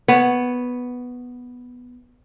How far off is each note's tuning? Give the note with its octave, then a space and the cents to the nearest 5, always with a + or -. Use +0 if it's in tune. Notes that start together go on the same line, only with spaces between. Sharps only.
B3 +0 C#5 +0